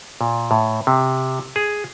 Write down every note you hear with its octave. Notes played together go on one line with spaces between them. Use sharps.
A#2
A2
C3
G#4